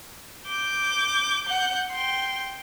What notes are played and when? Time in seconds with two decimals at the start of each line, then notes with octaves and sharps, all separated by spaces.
0.48 D6 G6
1.45 F#5 G6
1.92 G5 C6